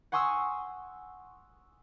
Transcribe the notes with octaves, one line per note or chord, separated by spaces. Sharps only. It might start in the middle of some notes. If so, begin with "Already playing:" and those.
F#5 G#5 C6 C#6 D#6 E6